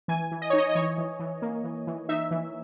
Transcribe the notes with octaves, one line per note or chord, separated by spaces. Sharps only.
E3 G#5
E3
D#5
D#4 C#5
D#5
D#5
E3 C#5
E3
E3
A#3
E3
E3
D#4 E5
E3